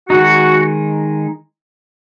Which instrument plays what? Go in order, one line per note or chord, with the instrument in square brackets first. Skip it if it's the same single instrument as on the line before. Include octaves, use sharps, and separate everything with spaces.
[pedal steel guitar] D#3 G#3 D#4 [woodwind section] F#4